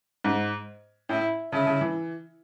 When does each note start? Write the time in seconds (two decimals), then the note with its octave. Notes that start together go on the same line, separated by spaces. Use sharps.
0.24 G#2
1.09 A2 E4
1.52 C#3 E4
1.66 C#3
1.81 E3